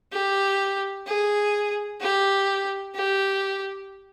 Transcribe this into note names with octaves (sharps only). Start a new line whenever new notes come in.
G4
G#4
G4
G4